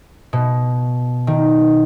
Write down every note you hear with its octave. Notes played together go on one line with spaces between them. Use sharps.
B2
D#3